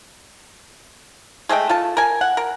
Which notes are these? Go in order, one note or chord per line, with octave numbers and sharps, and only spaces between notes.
G#3 A3 D#5 G5
F4 A4 A5
A#4 G#5
F#5
A#4